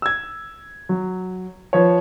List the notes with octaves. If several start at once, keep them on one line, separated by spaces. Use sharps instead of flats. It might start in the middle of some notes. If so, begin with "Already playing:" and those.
E6 G#6
F#3
F3 B4 C#5